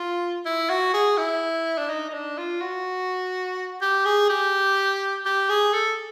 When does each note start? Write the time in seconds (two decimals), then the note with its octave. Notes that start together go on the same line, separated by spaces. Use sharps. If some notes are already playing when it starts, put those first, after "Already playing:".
Already playing: F4
0.46 E4
0.70 F#4
0.93 G#4
1.18 E4
1.78 D4
1.90 D#4
2.09 D#4
2.14 D4
2.38 F4
2.61 F#4
3.82 G4
4.05 G#4
4.30 G4
5.25 G4
5.49 G#4
5.73 A4